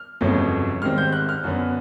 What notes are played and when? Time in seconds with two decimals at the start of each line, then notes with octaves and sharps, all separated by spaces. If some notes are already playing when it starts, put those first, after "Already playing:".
Already playing: F6
0.21 G1 F2 C#3 F#3 A3
0.82 G#2 D#3 G3 C4 F6
0.98 G6
1.12 F#6
1.29 F6
1.44 F#2 D3 F#3 B3